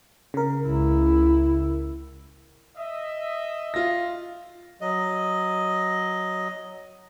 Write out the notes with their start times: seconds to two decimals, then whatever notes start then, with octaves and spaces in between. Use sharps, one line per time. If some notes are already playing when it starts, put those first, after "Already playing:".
0.34 C#3 A#4
0.66 C#2 E4
2.77 D#5 E5
3.74 F4 A#6
4.81 F#3 D#5